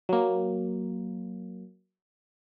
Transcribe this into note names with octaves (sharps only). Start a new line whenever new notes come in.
F#3 A#3